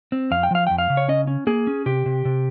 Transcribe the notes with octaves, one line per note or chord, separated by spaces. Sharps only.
C4
F2 F5
G5
F3 F5
F2 G5
F5
C#3
C#5
C#4 D#5
C#4
A#3 G#4
C#4
C3 G4
C3
C3